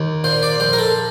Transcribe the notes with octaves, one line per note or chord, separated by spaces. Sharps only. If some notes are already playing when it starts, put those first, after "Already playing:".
Already playing: D#2
A#2 C5
D5
A#1 C5
A#4
A4